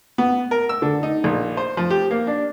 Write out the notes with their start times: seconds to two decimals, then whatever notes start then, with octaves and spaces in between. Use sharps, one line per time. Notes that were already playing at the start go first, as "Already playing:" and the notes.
0.18 B3
0.51 A#4
0.69 E6
0.82 D3
1.03 D#4
1.24 A#1
1.57 C5
1.77 F3
1.90 G4
2.11 A#3
2.27 D4